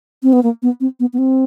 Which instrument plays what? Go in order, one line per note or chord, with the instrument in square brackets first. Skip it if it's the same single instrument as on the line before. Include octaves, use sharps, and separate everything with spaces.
[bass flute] C4
B3
A#3
B3
C4
B3
B3
C4